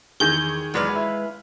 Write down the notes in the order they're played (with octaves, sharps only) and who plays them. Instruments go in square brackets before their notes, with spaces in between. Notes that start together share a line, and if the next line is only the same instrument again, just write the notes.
[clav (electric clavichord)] E2 [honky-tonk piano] D#3 G#4 [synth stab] G6
[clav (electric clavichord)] E2 F#3 D5 [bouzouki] G#3 B4 F5
[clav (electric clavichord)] E4